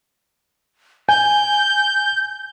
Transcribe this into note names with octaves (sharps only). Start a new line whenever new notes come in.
G#5 G6